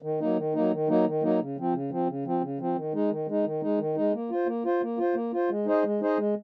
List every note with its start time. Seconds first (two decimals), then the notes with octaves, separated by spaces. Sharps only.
0.02 D#3
0.20 F#3 A#3 D#4
0.37 D#3
0.55 F#3 A#3 D#4
0.71 D#3
0.88 F#3 A#3 D#4
1.06 D#3
1.22 F#3 A#3 D#4
1.39 C#3
1.57 F3 C4
1.73 C#3
1.91 F3 C4
2.07 C#3
2.25 F3 C4
2.41 C#3
2.59 F3 C4
2.76 D#3
2.94 G#3 D#4
3.10 D#3
3.27 G#3 D#4
3.44 D#3
3.62 G#3 D#4
3.79 D#3
3.95 G#3 D#4
4.13 A#3
4.30 F4 C5
4.46 A#3
4.65 F4 C5
4.82 A#3
4.98 F4 C5
5.15 A#3
5.33 F4 C5
5.49 G#3
5.66 D#4 G#4 C5 D#5
5.83 G#3
6.01 D#4 G#4 C5 D#5
6.18 G#3